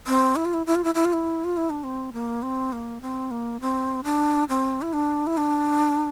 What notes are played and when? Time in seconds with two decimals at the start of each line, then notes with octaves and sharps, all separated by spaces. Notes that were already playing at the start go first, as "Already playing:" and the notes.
0.07 C4
0.36 E4
0.45 F4
0.54 E4
0.66 E4
0.75 F4
0.84 E4
0.95 E4
1.05 F4
1.13 E4
1.44 F4
1.57 E4
1.70 D4
1.84 C4
2.13 A#3
2.43 C4
2.72 A#3
3.02 C4
3.31 A#3
3.61 C4
4.04 D4
4.49 C4
4.82 E4
4.93 D4
5.27 E4
5.37 D4